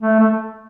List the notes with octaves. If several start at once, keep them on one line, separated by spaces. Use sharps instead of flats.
A3
A3